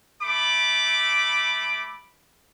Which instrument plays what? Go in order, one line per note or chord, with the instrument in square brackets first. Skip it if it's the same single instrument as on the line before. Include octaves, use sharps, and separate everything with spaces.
[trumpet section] A3 B5 D6